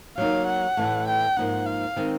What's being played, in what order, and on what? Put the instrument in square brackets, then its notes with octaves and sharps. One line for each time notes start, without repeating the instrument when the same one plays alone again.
[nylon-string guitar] F#3 A#3 D#4 [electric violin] F5
[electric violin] F#5
[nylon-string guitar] A2 E3 A3
[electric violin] G5
[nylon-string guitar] G#2 F3 A#3 D#4 [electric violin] F#5
[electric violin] F5
[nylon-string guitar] D#3 G#3 C4 D#4